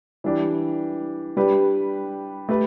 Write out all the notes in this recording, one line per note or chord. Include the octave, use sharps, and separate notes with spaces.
E3 G3 D4 G4
G3 D4 G4 B4
A3 G4 B4